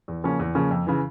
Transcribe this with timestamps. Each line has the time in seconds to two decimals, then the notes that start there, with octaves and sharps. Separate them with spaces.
0.08 E2
0.24 C#3 F3 A#3 C#4
0.39 E2
0.55 C#3 F3 A#3 C#4
0.71 F2
0.87 C#3 E3